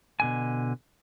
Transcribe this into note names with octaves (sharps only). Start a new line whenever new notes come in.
B2 D3 G#5